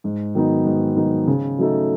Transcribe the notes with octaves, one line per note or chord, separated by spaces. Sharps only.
G#2
D#3 F#3 B3 D#4
G#2
D#3 F#3 B3 D#4
C#3
F#3 A3 D#4 A4